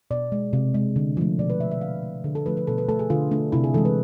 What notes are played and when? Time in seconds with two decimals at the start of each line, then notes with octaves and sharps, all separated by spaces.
0.11 B2 D5
0.32 G#3
0.53 C3
0.74 G#3
0.96 D3
1.17 F3 A3
1.39 B2 D5
1.50 B4
1.60 A3 E5
1.71 E5
1.81 D3 F5
2.03 A3
2.24 D3 G#4
2.35 A4
2.46 F3 A3 B4
2.57 B4
2.67 B2 A4
2.78 B4
2.89 A3 A4
2.99 G#4
3.10 D3 F4
3.31 A3 D4
3.52 C3 E4
3.64 G#4
3.74 E3 G#3 A4
3.85 B4